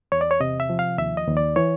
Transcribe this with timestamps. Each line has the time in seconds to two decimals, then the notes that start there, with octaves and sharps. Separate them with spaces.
0.12 E2 C#5
0.21 D5
0.31 C#5
0.40 C3 D#5
0.60 E5
0.70 F3
0.79 F5
0.98 D#2 E5
1.17 D#5
1.28 D#2
1.37 D5
1.56 E3 C#5